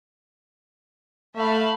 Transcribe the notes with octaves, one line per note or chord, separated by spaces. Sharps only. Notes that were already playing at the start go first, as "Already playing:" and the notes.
A3 E5 F5 B5